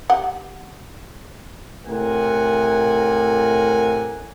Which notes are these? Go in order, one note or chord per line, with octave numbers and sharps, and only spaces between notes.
G4 F#5
A2 C3 A#4 F#5 G#5